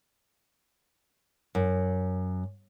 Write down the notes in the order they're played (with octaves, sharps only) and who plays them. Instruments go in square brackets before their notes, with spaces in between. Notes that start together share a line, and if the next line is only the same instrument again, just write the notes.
[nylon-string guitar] F#2